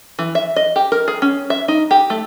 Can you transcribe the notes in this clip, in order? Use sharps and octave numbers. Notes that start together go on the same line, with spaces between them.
E3
E5
D#5
G4
A#4
G#4
C#4
E5
D#4
G4
A3